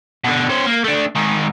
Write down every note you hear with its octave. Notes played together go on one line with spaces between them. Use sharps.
B2 D3
C#4 C5
A#3
A3 D4
G#2 D#3